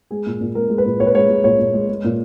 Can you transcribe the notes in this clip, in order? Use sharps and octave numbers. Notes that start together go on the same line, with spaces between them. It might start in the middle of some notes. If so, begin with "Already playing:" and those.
G#3 G#4
A#2
A#2
G#3 A#4
G#3
B4
A#2
A#2 C#5
B4
G#3 C#5
G#3
A#2 C#5
A#2
G#3
G#3
A#2